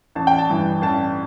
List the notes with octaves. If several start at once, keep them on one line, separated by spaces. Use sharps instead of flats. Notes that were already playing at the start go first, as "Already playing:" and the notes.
A1 A5
G5
A5
G2 E3
A1 A5